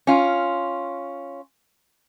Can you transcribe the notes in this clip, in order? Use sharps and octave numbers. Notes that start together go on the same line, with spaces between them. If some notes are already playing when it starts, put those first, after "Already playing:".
C#4 F4